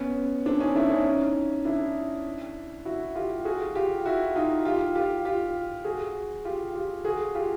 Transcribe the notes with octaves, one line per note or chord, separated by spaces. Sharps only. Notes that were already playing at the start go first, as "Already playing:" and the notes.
Already playing: B3 C#4
C4 D4
C#4 D#4
D4 E4
C#4 D#4
D4 E4
E4 F#4
F4 G4
F#4 G#4
F4 G4
E4 F#4
D#4 F4
F4 G4
F4 G4
F4 G4
F#4 G#4
F4 G4
F4 G4
F#4 G#4
F4 G4